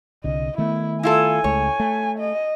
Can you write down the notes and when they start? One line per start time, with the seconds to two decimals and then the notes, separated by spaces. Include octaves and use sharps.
0.24 C2 D3 D#5
0.58 D#3 A3 B3 E4
1.03 E4 F4 A4 G#5
1.44 C#2 G#3 A3 C#5
1.80 A3
2.19 D#5